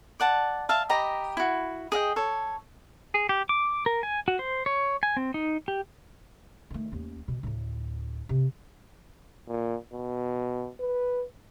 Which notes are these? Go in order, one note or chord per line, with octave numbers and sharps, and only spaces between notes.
D5 F#5 A5
E5 F5 A5
G4 D#5 A#5 B5
E4 F#4
G#4 D#5 F5 G5
A4 C#5
G#4
G4
D6
A#4
G#5
F#4
C5
C#5
G#5
C4
D#4
G4
D#3 A3
D#2 C#4
B2
D2 A2
C3
A#2
B2
B4